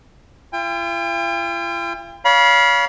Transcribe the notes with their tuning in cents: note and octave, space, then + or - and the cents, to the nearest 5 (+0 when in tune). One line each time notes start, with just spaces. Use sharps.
F4 -45 G5 +35
C#5 +35 F5 +0 B5 -30